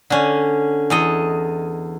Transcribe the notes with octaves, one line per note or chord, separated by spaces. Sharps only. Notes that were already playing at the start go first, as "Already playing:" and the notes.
D3 C#4
E2 A4 D#5